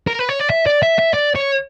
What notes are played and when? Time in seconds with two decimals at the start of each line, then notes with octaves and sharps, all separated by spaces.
0.07 A#4
0.19 B4
0.29 C#5
0.39 D5
0.50 E5
0.67 D5
0.83 E5
0.99 E5
1.14 D5
1.36 C#5